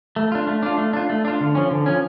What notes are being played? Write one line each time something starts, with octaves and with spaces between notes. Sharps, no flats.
A3
D4 F4
A3
D4 F4
A3
D4 F4
A3
D4 F4
D3
F3 C#4
D3
F3 C#4